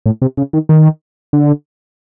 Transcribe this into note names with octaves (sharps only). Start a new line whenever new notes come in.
A2
C3
C#3
D#3
D#3
D3